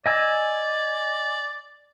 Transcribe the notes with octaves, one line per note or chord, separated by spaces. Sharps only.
D5 D#5 G#5 E6